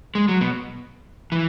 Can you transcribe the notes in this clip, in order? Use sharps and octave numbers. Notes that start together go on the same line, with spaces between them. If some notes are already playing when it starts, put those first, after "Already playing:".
G#3
F#3
B2
E3